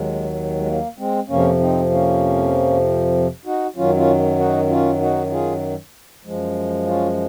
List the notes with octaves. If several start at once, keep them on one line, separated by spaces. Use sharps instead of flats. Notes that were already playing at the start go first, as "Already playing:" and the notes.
Already playing: D#2 D#3 F#3 G#3
G#3
A#3
G#3 C4
F2 C3 F3 A#3 C#4
C4 D#4
A#3 C#4
D#4 F#4
F#2 D#3 F#3 C#4 F4
C#4 F4
D#4 F#4
C#4 F4
D#4 F#4
F4 G#4
F#2 F3 G#3
C#4 F4